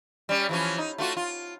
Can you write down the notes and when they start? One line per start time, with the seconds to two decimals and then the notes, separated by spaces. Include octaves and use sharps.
0.29 G3 C#4
0.49 E3 F3 C#4
0.78 D#4
0.98 A3 F4 F#4
1.17 F4